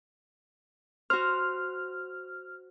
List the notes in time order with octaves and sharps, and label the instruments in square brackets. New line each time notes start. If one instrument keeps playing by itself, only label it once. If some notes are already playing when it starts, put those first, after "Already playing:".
[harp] F#4 C5 [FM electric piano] F6